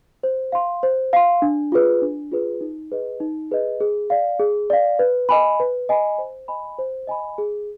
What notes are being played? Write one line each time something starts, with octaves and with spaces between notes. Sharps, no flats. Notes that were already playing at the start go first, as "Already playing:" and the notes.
C5
F5 C6
C5
F5 C6
D4
F4 G#4 B4
D4
F4 G#4 B4
D#4
G#4 B4 D#5
D#4
G#4 B4 D#5
G#4
D5 F5
G#4
D5 F5
B4
D#5 G#5 B5
B4
D#5 G#5 B5
C5
D#5 G#5 B5
C5
D#5 G#5 B5
G#4